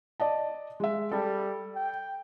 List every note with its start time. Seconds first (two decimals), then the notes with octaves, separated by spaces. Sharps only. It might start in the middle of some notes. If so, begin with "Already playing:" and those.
0.20 D5 D#5 A5
0.80 G#3 E5
1.12 G3 A4
1.76 G5